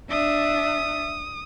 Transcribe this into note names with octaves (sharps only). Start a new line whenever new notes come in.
D4 E5 D#6